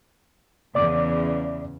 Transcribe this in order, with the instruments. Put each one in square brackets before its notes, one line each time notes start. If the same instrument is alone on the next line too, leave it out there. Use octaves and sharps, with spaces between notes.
[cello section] E2 C#3 [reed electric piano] D5 D6